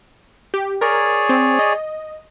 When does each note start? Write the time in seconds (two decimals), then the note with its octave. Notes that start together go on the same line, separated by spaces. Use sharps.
0.54 G4
0.81 G#4 A#4 C#5 D5
1.29 C4
1.59 D#5